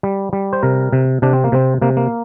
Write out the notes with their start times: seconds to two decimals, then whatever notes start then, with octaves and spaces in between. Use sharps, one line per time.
0.03 G3
0.33 G3
0.53 C5
0.63 C3 A#4
0.92 C3
1.22 C3 D4
1.33 C4
1.44 A#3
1.52 C3 C4
1.82 C3 A#3
1.97 A#3